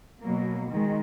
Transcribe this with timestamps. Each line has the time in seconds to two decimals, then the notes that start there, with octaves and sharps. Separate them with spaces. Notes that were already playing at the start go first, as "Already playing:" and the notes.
0.22 B2 F#3 A#3
0.70 D#3 G#3